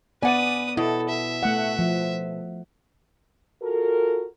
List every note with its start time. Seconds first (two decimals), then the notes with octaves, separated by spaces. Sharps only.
0.23 B3 B4 D5 F#5 G#5 D#6
0.77 B2 E4 A4
1.09 E5
1.43 A3 F#5
1.79 F3
3.62 F4 F#4 A4 A#4